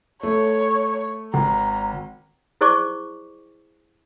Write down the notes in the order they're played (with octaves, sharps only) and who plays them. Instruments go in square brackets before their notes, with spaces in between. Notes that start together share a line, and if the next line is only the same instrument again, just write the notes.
[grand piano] A3 [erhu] C#5
[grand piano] G#1 [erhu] A#5
[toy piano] E4 G#4 C5 D5 C#6 D6